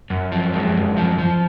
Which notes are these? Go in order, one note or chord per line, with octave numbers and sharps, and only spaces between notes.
F#2
F3
G#3
F#2
F3
F3